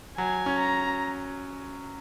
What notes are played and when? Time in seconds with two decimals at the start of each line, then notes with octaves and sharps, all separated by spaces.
0.18 F#3 G#5
0.46 C#4
0.59 A#5